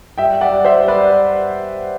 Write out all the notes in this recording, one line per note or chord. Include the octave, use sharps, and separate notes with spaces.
G3 E5 G5
D5 F#5
G3
C5 E5
G3
B4 D5